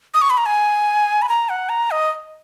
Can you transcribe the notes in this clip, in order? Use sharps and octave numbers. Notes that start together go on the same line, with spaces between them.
D#6
C#6
B5
A#5
G#5
B5
A#5
F#5
A#5
D#5